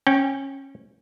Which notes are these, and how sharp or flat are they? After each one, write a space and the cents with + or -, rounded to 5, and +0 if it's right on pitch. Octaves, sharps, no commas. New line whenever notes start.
C#4 -20 G5 +0